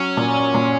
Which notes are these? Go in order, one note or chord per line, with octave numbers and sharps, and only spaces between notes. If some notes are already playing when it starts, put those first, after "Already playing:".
Already playing: F#3 C#4
A#2
A#2